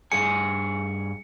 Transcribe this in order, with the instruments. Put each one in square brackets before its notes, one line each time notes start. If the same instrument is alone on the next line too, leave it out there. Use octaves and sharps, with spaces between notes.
[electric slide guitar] G2 G#4 G#5 [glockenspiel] C#7